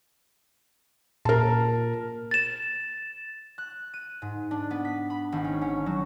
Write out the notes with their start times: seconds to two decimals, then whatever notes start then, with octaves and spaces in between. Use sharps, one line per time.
1.25 A#2 A#4 A5
2.31 A6 E7
3.58 F#6
3.94 D#7
4.22 G#2
4.51 D4
4.70 B3
4.85 B6
5.10 B5
5.32 G#1
5.44 C#4
5.62 C#4
5.86 F#3